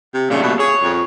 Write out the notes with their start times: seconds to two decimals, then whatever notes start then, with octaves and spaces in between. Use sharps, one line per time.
0.14 C3
0.30 A#2 C#3 G3 A3
0.43 B2
0.59 G#4 C#5
0.83 F2